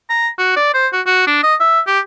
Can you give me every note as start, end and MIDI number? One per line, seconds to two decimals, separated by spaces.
0.10 0.28 82
0.38 0.55 66
0.57 0.69 74
0.74 0.88 72
0.93 1.01 66
1.06 1.26 66
1.27 1.41 62
1.43 1.55 75
1.60 1.80 76
1.87 2.00 67